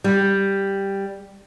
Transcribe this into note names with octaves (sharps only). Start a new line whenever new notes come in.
G3